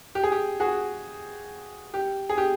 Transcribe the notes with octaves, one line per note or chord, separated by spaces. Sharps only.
G4
G#4
G4
F#4 G#4
G4
G#4
G4